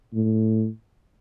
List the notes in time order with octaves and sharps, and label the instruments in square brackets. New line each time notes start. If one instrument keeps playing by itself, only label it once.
[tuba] A2